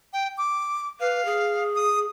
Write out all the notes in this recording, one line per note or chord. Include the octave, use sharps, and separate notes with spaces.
G5
D6
B4 F5
G#4
D#6